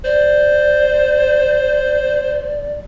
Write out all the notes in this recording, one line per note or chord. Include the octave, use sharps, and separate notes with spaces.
C5 D5